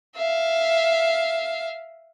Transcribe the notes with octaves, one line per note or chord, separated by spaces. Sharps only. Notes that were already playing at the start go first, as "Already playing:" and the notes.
E5 F5